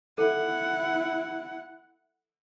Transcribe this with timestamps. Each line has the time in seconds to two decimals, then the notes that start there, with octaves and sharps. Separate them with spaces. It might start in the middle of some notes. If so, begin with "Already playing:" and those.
0.18 E4 A4 F#5